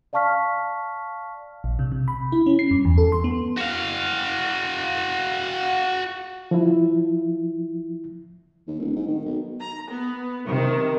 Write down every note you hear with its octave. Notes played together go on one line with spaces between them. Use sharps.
D5 F5 A5 C#6 F6 B6
A#1
C3
C3
B5
E4
C#4
C7
G2
E2
A4
C6
B3
F#4 F5
F3 E4
D#2
D1
G#2
D#3
B1
A#5
B3
C3 D#3